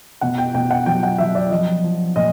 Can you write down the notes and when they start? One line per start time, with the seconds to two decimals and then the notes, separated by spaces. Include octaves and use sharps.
0.21 B2 F#5
0.38 G5
0.54 B2 G5
0.71 F#5
0.86 F#3 G5
1.03 F#5
1.18 F#3 E5
1.35 D5
1.50 F3 D#5
1.84 F3
2.16 A#2 D#5